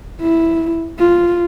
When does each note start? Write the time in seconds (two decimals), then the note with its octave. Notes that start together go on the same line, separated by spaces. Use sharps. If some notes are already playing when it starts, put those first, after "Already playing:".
0.20 E4
0.99 F4